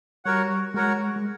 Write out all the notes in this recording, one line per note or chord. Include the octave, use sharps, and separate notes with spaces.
G3 F#4 A#4 C#5 F#5
G#3 F#4 A#4 C#5 F#5
G#3